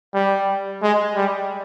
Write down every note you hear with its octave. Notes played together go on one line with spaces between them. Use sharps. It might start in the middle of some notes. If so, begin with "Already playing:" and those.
G3
G#3
G3